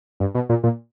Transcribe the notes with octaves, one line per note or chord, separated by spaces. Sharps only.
G2
B2
A#2
A#2